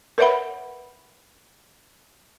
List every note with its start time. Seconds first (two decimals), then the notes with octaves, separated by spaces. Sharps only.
0.18 A#4 B4 C#5 E5 F#5 B5